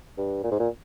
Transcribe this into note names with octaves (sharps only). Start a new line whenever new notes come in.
G2
A#2
G#2
A#2